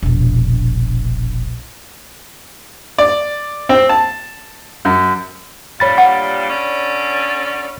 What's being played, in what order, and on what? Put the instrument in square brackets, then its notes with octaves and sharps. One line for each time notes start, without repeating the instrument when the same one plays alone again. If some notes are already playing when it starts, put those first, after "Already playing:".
[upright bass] E1 A#1
[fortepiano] D5
C4
A5
F#2
[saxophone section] G2 A#2 G3 [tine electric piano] C#5 B5 A6
[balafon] F#5
[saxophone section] D3 C#4 D5